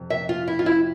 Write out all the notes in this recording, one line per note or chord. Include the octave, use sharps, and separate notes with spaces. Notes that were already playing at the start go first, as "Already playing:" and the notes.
Already playing: F2 C3
E5
F4
E4
F4
E4